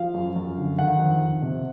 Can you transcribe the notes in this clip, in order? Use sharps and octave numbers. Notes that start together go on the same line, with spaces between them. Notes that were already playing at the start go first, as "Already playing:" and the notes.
Already playing: F3 F5
F#2
F#2
D3
D#3 F#5
F2
F2
C3